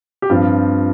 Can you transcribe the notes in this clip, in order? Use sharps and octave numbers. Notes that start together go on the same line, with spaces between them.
G4
G2 F3 C4 F4